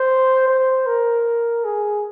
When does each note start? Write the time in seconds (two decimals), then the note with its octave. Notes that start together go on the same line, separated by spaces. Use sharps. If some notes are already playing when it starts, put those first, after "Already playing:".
Already playing: C5
0.47 C5
0.87 A#4
1.65 G#4